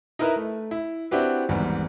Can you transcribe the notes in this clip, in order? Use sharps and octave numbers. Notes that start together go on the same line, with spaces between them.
D#4 E4 A#4 B4 E5
A3
E4
C4 D4 E4 F#4 G4 B4
G#1 E2 G#2 G3 B3